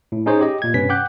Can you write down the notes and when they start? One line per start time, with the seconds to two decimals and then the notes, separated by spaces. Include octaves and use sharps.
0.12 A2
0.26 C#4 D#4 G#4 C5 C#5
0.41 G4 D#5
0.62 A#2 G#6
0.74 G2 C3 C#4 B4 B6
0.89 F#5 G5 D6 F#6 G6